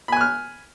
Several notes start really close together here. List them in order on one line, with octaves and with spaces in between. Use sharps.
B5 G#5 F#6 F6